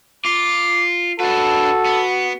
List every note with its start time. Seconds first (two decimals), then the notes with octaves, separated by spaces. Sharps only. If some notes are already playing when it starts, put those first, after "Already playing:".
0.25 F4 D6
1.20 D4 F#4 A4 B4
1.85 B3